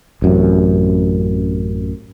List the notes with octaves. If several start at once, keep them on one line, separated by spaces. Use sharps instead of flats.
A1 F#2 C3